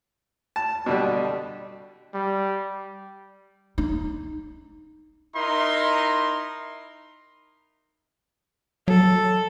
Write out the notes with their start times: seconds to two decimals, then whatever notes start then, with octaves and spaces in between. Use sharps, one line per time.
0.56 A5
0.86 B2 D3 G3
2.14 G3
3.78 D#4
5.35 D#4 E4 A#4 B5 C6
8.88 F#3 A4